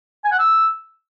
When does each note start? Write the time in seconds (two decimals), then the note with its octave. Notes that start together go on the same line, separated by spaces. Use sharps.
0.24 G#5
0.32 F#5
0.39 E6